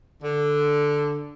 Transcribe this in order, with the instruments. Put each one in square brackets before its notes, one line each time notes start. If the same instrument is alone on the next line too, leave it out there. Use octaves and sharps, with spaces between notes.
[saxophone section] D3